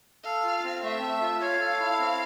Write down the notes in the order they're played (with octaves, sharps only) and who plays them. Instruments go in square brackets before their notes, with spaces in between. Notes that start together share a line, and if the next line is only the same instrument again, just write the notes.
[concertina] A4 [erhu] F5
[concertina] F4
C4
[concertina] A3 [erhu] E5
[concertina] A4
F4
[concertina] C#5 [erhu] F5
[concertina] A4
E4
C4